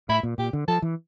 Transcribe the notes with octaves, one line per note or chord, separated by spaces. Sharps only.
A2 E4
A#2
A#2 G4
D3
F3 A4
E3